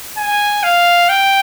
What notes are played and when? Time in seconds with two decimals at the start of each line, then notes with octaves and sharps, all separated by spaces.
0.18 G#5
0.63 F5
1.09 G5